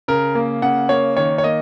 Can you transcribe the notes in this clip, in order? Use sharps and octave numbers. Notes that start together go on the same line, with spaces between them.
C#3 A#4
A#3
C#3 F#5
A#3 C#5
D#3 C#5
C#5
A#3 D#5